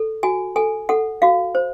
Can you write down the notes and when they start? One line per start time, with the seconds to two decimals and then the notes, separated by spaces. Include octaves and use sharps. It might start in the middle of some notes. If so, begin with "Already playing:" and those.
Already playing: A4
0.23 F#4 G#5
0.56 A4 G#5
0.89 A4 F#5
1.22 F#4 F5
1.55 C5